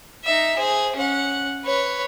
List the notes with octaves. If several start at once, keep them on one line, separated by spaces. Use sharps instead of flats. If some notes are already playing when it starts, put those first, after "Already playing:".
D#4 E5
G#4 C5
C#4 F#5
B4 C#5